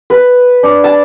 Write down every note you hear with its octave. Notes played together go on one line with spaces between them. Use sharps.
B4
D4
A5